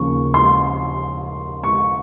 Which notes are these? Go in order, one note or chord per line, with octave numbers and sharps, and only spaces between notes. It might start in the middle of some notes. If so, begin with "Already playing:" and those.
Already playing: D#2 C#3 F3 A#3 C#6
C6
C#6